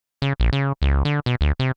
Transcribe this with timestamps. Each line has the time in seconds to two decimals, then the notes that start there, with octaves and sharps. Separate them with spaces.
0.22 C#3
0.40 A#1
0.53 C#3
0.82 C#2
1.05 D3
1.26 B2
1.41 D2
1.59 C3